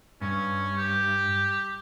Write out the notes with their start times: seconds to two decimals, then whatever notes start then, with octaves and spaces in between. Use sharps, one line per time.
0.21 G2 C#4
0.77 G4